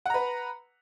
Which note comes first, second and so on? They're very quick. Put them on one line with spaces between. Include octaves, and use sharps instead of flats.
F#5 A#5 B4